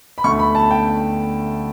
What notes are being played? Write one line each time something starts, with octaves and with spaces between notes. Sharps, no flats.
B5
D2 D3 A3 C#6
B5
A5
G5